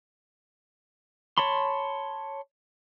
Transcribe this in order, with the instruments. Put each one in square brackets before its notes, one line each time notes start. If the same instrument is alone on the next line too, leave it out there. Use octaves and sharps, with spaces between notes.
[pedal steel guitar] C#5 A5 B5 C6